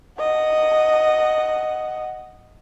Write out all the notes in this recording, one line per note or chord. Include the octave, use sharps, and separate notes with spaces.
D#5 F#5